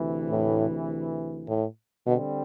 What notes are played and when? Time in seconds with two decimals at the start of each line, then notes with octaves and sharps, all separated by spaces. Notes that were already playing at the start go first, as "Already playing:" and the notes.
Already playing: D2 C3 E3
0.30 A2
1.48 A2
2.06 B2 D3 G3 C4